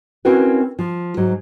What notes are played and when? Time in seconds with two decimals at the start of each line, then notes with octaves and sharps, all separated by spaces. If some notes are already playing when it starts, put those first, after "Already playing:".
0.25 C4 C#4 E4 F#4 A#4 B4
0.79 F3
1.17 G#2 F#3